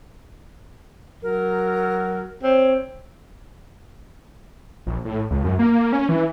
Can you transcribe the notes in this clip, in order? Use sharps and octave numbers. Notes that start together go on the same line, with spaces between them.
F#3 A#4
C4 C#5
A#1
A2
C#2
F#2
A#3
C#4
E3